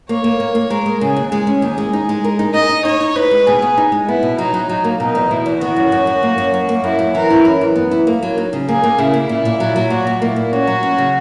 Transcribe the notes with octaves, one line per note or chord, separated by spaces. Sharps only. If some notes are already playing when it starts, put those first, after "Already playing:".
A#3 C#5
A#3
A#3
A#3
G#3 A#4
G#3
C#3 G#4
D#2
G#3 G#4
C#4
D#2
G#3
D#4
G#3
A#4
D#4
D#4 D#5
D#4
D#4 C#5
D#4
D#4 B4
G#3
B2 G#4
B3
D#4
G#3
B3 E4
B2
F#3 D#4
F#3
F#3 D#4
A#3
B2 D#4
E2
B2 E4
E2
D#3 F#4
F#2
F#2
F#2
A#3
F#2
F#2
A#3
F#2 E4
F#2
E3 A#4
E4
F#2
E3
B3
E4
A#3
F#3
D#4
C#3
A#3 G#4
A#3
C#3 E4
A#3
A#2 E4
A#2
F#3
F#3
A#2 F#4
A#2
A#3 E4
A#2
C#4 F#4
F#3
C#4
C#3